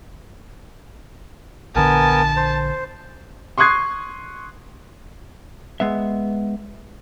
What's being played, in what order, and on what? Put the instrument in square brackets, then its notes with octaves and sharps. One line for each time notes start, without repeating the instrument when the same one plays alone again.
[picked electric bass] A#1 D3 [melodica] B3 A#4 G#5 [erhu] A5
[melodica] C5
[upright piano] C6 C#6 D#6 F#6 G#6 C7
[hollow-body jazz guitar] G#3 B3 E5